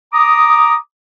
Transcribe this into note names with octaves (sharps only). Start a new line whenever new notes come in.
A#5 D6 D#6